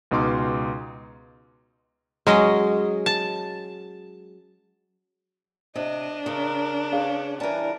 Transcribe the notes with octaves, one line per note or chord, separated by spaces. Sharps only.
C#2 B2 D#4 C6 D6
F#3 G#3 C#4 D#5
A5
C3 D4 D#5
C#3 A#4
C#4 G#4 B4 F5
E3 G3 A#4 A5